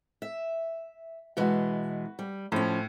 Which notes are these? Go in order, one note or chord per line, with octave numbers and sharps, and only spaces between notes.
E5
B2 E3 G#3 F#4 B4
G3
A2 F3 C#4